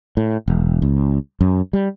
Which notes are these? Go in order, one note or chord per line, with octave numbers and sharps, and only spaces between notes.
A2
E1
C#2
F#2
G3